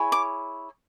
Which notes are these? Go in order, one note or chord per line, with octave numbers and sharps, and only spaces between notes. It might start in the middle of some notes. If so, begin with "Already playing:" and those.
Already playing: E4 G#4 C#5
D6